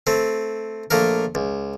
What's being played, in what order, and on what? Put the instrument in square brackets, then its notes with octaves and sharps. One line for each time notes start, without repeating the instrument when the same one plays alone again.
[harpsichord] A3 C4
A#1 A3 A#3 A#4
C#2